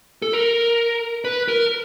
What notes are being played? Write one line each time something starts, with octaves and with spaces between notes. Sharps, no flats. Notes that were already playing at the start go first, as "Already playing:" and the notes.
A4
A#4
B4
A#4